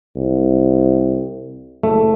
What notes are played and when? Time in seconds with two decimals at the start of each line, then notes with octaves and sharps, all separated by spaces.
0.16 C2
1.83 F#1 A3